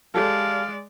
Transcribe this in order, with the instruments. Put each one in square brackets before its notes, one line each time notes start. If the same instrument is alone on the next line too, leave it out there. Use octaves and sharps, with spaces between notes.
[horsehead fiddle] G#3 D5 [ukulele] G4 A4 [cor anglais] F5